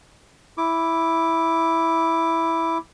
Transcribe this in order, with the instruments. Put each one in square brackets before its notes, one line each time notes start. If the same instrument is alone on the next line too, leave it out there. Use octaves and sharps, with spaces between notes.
[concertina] E4 D6